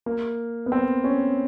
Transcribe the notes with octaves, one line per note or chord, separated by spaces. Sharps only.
A#3
B3
C4
C#4